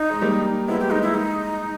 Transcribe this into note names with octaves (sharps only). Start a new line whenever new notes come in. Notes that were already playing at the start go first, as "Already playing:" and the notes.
Already playing: D#4
G#3
G3 A#3
G#3 B3 E4
G4
G#3 D#4
E4
G#3 D#4